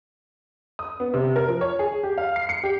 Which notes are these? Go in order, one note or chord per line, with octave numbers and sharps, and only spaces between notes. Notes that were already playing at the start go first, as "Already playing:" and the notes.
D#6
B3
C3
A#4
F3
C#5
G#4
G4
F5
C7
C#7
G4